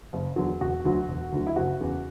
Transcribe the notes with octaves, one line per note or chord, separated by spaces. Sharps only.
F#1
E2 D3 F#3
E1 F#4
D2 D3 F#3
E1
D2 D3 F#3
E4
F#1 F#4
E2 C#3